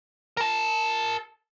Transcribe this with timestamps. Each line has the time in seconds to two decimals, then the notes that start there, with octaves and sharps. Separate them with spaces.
0.37 A#4 A5